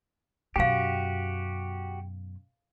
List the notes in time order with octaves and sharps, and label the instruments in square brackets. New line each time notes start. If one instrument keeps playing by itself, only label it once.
[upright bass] F#2 B2 [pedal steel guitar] F#4 G4 [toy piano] F5 G5